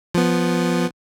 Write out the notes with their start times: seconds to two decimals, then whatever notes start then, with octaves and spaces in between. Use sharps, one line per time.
0.14 F3 B3